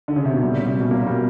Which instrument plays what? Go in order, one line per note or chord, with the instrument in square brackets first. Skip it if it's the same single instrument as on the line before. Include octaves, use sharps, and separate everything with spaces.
[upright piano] D3
C#3
C3
B2
[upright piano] A#2 [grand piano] G3
[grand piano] C#4
[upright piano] C3
[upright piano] B2 [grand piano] G3
[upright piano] A#2 [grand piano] A#3
[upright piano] B2 [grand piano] G3